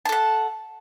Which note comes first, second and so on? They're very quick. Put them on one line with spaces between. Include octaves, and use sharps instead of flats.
A5 A4 F#5